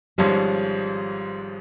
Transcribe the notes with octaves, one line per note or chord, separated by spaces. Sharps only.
G#1 G#2 F3 G3 G#3 C#4